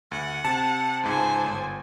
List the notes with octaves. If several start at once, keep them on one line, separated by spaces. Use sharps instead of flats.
D2 F#5
C3 A5
C#2 G#2 C5 G#5
G1